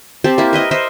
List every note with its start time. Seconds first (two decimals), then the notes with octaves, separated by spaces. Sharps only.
0.24 C4 G4 C5 A5
0.38 A#3 E4
0.53 A#4 B4 D#5 E5
0.71 C5 D#5 E5